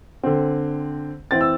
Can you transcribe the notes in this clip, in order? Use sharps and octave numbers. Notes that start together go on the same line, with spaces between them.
D3 C4
E3 C4 A6
E6